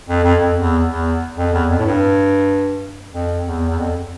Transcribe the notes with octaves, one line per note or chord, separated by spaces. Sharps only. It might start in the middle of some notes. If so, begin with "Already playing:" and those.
F2
F2
F2
E2
E2
F2
E2
F2
A2
G2
F2
E2
E2
F2